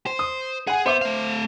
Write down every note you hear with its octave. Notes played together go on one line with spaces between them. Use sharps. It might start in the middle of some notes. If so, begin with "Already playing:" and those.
C5
D#6
G#4 F#5 G#5
B3 C5 E5 D6
A3 F5